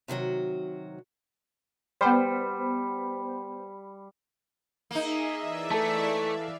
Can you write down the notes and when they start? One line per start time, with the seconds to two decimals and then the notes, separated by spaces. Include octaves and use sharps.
0.08 C3 D#3 F#3 F#4
2.01 G3 B3 C5
4.91 A#3 D#4 G#4 D#5 E5
5.41 E3 D5 E5
5.71 A3 A4 A5
6.25 F5